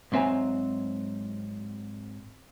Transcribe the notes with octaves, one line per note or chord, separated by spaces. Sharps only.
G#2 F#3 C4 E5 G#5 A#5